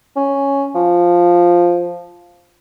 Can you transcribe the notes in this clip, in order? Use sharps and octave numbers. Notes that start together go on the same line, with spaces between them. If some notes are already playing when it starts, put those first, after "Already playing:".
C#4
F3